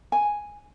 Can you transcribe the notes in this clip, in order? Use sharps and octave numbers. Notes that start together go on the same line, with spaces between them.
G#5